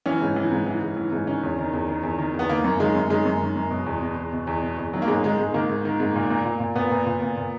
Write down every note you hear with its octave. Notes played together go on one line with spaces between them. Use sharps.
E3 C#4
G#2
E3
G#2
E3
G#2
E3
G#2
D#3 C#4
E2
D#3
E2
D#3
E2
D#3
E2
B3
D#3 A#3
F#2
D#3 G#3
F#2
D#3 G#3
F#2
D#3
F#2
B2
E2
B2
E2
B2
E2
B2
E2
D#3 F#3
A#3
G#2 G#3
D#3 G#3
G#2 G#3
D#3 A#3
G#2
D#3
G#2
A#2
A#2
A#2
A#2
A#2 B3
A#2
A#2
A#2
A#2